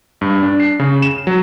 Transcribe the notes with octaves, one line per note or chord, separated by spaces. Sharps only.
G2
D4
C7
C#3
E7
F#3